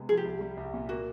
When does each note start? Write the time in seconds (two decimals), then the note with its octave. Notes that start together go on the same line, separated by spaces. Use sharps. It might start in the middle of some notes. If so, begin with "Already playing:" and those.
Already playing: C3 G#3 B3
0.09 F3 G#4
0.17 G4
0.25 C2
0.41 G3
0.57 C2
0.74 A#2
0.89 A#3 F#4